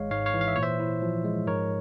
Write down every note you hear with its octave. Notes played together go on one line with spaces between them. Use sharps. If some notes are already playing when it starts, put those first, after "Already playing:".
Already playing: G#1 G#3 C#5 F5
G#2 C#5 F5
C#5 F5
E3
F5
E5
A#2 C#5
C5 E5
E4
F3
G#3
G#2 A#4 C#5